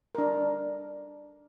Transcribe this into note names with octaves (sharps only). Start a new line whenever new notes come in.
D4 A#4